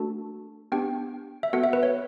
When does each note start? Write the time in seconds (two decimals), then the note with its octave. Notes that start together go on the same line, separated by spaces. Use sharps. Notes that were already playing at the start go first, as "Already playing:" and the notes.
Already playing: A3 D4 F#4 A4 A5
0.72 B3 D4 G4 G5
1.43 E5
1.53 B3 F#4 A4 F#5
1.64 E5
1.73 B4
1.83 C#5